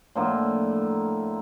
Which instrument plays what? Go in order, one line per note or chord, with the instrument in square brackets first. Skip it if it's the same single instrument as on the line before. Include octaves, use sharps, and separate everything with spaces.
[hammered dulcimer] A2 D3 F3 A#3